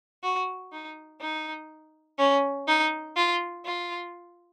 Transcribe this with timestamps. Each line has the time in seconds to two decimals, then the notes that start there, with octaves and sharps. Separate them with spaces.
0.23 F#4
0.72 D#4
1.21 D#4
2.19 C#4
2.68 D#4
3.16 F4
3.65 F4